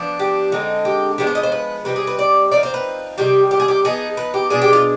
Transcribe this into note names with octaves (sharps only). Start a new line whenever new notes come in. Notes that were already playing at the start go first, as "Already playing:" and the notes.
Already playing: F3 B3 D4
G4
D3 G#3 C4 D#4
G4
F3 G#3 B3 D4 G4
C5
D#5
C5
B4
C3 G3 C4 D#4 B4
G#4
B4
D5
F3 C4 D#4 D5
C5
B4
C3 D#3 G3 G4
G4
G#4
G4
F3 B3 D#4 G#4
B4
G4
B2 G#3 D4 G#4
G4
F4